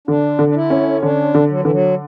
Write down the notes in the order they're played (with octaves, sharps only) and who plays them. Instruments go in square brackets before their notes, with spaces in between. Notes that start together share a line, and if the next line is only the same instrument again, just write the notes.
[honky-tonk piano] D3 [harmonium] D4
[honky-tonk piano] D3
[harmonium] D4
E4
[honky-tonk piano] C#4
[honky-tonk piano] D3 [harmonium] D4
[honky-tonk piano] D3
[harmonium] F#3
[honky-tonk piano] D3 [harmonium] E3
[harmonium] F#3